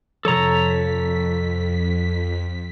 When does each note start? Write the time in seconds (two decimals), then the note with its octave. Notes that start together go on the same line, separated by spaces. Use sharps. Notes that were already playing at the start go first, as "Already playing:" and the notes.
0.25 F2 C3 F3 A4 C#5 A#5 B6